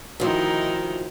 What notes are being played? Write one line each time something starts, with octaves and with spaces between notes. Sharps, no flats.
D2 D#3 F3 D#4 E4